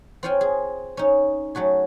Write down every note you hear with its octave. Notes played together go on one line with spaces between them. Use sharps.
C4 F4 C#5 F5 G5 G#5
G#4
C#4 D#4
F#3 A3 F#4 G#4